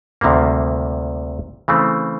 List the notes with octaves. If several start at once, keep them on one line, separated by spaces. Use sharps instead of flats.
D2 C3 D#3 G3 A#3
C#3 E3 A3 C4